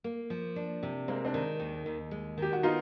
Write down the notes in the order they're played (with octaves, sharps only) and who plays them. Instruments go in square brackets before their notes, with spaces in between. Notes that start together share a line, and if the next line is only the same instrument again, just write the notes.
[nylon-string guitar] A#3
F3
D4
C3
[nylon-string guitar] G#3 [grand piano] A#3 C4
[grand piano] C4 D4
[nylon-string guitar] D#3
D#2
D#2
G#3
[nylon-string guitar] D#3 [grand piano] G4
[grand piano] F#4
[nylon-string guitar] B3 [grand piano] D#4 F4